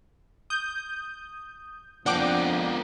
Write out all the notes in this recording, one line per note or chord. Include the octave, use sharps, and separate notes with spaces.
D#6 G6
F2 F3 A#3 B3 D4 F#5 G5 D6